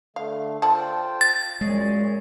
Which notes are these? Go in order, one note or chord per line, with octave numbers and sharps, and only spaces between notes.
D3 A3 F5
F4 A4 C5 D5 G5 A5
A6
F#2 A#2 G#3 C#5